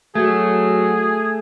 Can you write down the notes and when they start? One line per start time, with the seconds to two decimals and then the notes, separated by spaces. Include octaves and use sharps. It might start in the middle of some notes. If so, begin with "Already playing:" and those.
0.15 F#3 A3 F#4 G#4